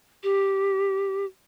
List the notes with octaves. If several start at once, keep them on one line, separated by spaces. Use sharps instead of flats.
G4